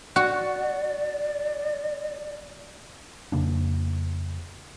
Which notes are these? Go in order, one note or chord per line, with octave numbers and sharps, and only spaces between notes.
F#4 D5
F2 C#3 A#3 D4